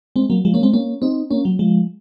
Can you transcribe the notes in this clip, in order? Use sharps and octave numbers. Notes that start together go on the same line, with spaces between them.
G#3 C4
F#3 A#3
F3 G#3
A#3 C#4
G#3 C4
A#3 C#4
C4 D#4
A#3 C#4
F#3
F3 G#3